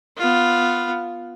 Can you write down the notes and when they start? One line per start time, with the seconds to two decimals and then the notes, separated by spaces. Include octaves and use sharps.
0.17 B3 F4